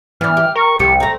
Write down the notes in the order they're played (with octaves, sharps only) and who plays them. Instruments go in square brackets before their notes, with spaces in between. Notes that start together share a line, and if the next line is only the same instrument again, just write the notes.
[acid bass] E3 [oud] B3 D4 [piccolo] F6
[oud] G4
[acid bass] A#4 [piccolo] C#6
[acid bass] C2 [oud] F3 G4 [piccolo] C#7
[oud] A3 C4 [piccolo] A#5